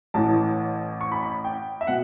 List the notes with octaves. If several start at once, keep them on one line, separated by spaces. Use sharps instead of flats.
A1 A2 E3 A5
C#6
B5
B5
G5
E5
B2 F#5